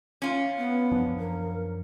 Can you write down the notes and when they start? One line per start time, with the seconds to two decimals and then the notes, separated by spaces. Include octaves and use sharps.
0.22 C#4 F4
0.57 B3
0.92 F#2 F3 D4
1.19 A#4